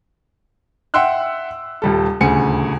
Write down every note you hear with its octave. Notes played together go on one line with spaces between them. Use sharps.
E5 F#5 G5 C6 E6 F#6
D#1 G3 A4
D#1 D2 C#3 G#5 C#7